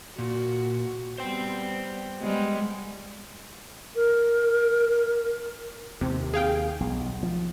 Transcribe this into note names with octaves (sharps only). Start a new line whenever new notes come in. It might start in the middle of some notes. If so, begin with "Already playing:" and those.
A#2 F#4
G3 B3 C5 G5
G3 G#3 B3
A#4
D#2 C3
G#4 F5 G5
B1
F3